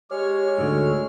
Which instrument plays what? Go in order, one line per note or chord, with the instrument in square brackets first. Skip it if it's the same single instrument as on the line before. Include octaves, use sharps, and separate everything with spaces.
[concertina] G#3 G#4 F6 [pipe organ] G4 [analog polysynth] C#5
[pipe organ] D2 F#4 A4 [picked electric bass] G#2 D3